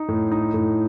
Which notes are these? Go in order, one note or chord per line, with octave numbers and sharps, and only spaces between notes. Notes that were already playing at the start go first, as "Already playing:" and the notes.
Already playing: D#4
A2
D#4
A2